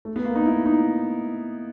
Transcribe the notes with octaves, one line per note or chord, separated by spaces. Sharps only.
A3
B3
A#3
D#4
E4
D#4